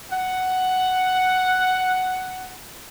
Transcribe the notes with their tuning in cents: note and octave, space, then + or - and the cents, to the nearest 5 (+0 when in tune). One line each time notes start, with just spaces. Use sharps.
F#5 +5